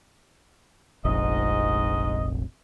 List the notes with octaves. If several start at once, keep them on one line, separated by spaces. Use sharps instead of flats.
F1 A#1 G#2 D#5